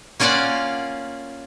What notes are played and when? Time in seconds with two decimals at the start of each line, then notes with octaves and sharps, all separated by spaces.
0.20 A#3 C#4 F4 D5 F5 F#5